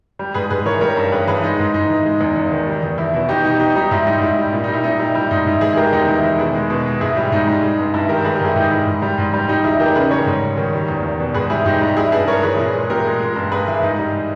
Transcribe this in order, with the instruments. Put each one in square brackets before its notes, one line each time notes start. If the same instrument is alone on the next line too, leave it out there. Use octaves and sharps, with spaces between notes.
[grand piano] G3
G#2 G#4 B4
G#2 G#4 B4
E3 A#4 C#5
G3 A#4 C#5
G2
G2 G#4 B4
E3 G#4 B4
G#3 D#4
G#2
G#2 D#4
E3
G#3
E2
E2
D#3
G3
E2
E2 E4
B2 E4
B2 D#4 G4
G3 D#4 G4
B2 D#4 G4
G3 D#4 G4
G#2 E4
G3 D#4
G#2 E4
G3
A#2
D#4
G3
E4
A#2 D#4
G3 E4
G3 E4
G#2 D#4
G#2 E4
E3 E4 G#4
G#4
G#3 G4 A#4
E2 D#4 G4
E2 E4
D#3 E4
B2 E4 G#4
G#3
B2
G#3
G#2 E4 G#4
G3 E4
G#2 D#4
G3
G#3
G2
G2 E4
D#3 G4 A#4
G3 G#4 B4
G4 A#4
G#2 E4 G#4
G#2 D#4 G4
E3 E4
G#2
G3
G#2
G3
G3 D#4 G4
E2 E4 G#4
E2 G4 A#4
C#3 G#4 B4
G3 A#4 C#5
G#2
G#2
D#3
G3
E2
E2
B2
G#2 G#4 B4
G3 E4 G#4
G#2 D#4 G4
G3
G3 E4 G#4
G2 G#4 B4
G2 A#4 C#5
E3 G#4 B4
A#2
G#3
A#2 G4 A#4
G#3
G#3
G2
G2 G#4 B4
E3 E4
G#2 D#4
G3